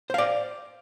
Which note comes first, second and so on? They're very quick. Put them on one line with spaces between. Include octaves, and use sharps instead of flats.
C5 F5 D5